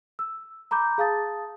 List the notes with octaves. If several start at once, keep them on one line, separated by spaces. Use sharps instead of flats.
E6
A#5 B5 D6 G6
G#4 F5 A5 D#6 A6